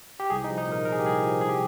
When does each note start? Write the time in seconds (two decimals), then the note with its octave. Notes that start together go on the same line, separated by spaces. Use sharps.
0.20 G4
0.30 C2 G#4
0.44 D#4
0.50 F3
0.58 D#4
0.67 A#2 A#4
0.85 C2 A#4
0.92 G#4
0.99 G4
1.04 C2 G#4
1.23 F3
1.41 C2 G#4
1.49 G4